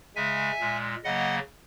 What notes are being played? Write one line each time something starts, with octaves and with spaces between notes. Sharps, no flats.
C#3 G#3 E5 G#5
A#2 G#3
C#3 F#3 A#3 D#5 F#5